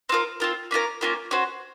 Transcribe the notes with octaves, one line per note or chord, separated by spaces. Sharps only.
C4 F4 A#4
C4 F4 A#4
A#3 C#4 F4 A#4
A#3 C#4 F4 A#4
C#4 F#4 C5